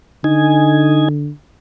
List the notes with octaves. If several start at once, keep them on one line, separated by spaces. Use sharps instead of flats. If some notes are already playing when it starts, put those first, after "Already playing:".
D3 D#4 G#5